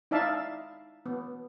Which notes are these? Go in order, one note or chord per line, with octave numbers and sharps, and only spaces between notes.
D#4 E4 D5 E5 F5 A5
B3